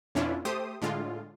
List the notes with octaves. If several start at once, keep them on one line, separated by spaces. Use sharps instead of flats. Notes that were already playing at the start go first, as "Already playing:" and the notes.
F2 B2 C#4 D4 E4 F4
A3 G4 C5 D#6
A2 D3 G#3 F4